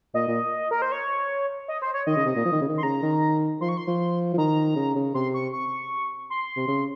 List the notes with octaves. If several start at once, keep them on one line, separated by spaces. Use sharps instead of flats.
A#2 D#5
A#2
A#4
C5
C#5
D#5
C5
C#5
D#3 D#5
C#3
C3
A#2
F3
D#3
C#3
D#3
C6
C#3 A#5
D#3
F3 C6
C#6
C6
F3
F3
D#3 A#5
C#3
C#3
C3 C6
C#6
C#6
C6
C3
C#3